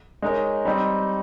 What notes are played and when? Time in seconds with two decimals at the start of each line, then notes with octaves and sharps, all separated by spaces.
0.22 G#3 D#4 A#4 C#5
0.65 G3 C4 D#4